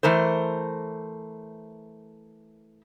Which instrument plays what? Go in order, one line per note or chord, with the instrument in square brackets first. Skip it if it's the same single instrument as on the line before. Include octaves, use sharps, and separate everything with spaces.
[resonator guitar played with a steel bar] E3 A3 A#4 C5